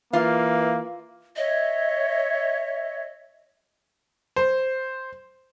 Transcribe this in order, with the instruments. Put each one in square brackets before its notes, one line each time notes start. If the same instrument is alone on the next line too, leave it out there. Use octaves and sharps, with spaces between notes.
[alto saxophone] E3 [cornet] A#3 [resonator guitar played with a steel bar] F4 F5
[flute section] C#5 E5 [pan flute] D#5
[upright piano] C5